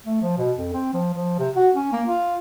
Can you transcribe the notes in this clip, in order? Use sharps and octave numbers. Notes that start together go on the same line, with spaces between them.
A3
F3
B2
F2
C4
F3
F3
C3
F#4
C#4
A#3
F4